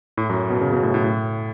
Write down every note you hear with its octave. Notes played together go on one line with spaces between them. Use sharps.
A2
F#2
B2
C#3
B2
A2
A2
A2